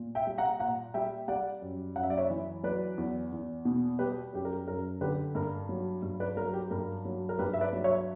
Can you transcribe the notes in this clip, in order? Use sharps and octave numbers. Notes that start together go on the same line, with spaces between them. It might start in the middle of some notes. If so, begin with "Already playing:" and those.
Already playing: A#2
E5 G5
G3
F#5 A#5
A#2 F#5 A#5
G3 E5 G5
G3 D5 F#5
F#2
F#2 F#5
E5
D5
C#5 E5
E3
F#3 B4 D5
E2
E2
B2
G3 G4 B4
F#2 G4
A#4
F#2 A#4
D3 G4 B4
G2 A#4
F#3
G2
B4 D5
F#3 A#4
G4
G2 A#4
F#3
A#4
G2 G4 B4
E5
B4 D5
F#3
C#5 E5